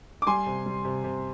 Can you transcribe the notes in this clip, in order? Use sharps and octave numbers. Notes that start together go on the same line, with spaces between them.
D6
G3 G#5 C6
C3
G3
C3
C3